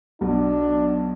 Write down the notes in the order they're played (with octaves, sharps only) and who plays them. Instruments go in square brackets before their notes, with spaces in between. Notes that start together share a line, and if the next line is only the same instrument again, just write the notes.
[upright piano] B1 F#4 [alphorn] D4